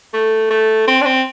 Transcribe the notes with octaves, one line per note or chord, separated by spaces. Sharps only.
A3
A3
C4
D4
C4